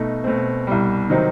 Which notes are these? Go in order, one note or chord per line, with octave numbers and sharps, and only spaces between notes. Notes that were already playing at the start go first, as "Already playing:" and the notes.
Already playing: B2 A3 D#4
B2 A3 C4
C2 B2 G3
C3 D#3 F#3 C4 D#4